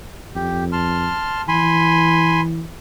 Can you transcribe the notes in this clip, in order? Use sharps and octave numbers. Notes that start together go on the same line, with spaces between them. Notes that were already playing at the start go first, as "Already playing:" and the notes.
F2 G4
A5 C6 F6
E3 G#5 B5 C6